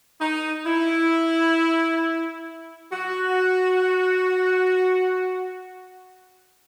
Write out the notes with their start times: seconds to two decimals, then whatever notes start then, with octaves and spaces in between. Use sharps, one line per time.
0.20 D#4
0.66 E4
2.92 F#4